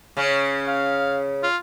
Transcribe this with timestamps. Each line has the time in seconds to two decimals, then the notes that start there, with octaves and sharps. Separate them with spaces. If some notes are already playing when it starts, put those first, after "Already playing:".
0.17 C#3 C#4
0.67 F5
1.43 F4